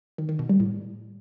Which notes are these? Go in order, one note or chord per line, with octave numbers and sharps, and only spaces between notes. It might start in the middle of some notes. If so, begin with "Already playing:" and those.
D#3
D#3
B2
G3
A2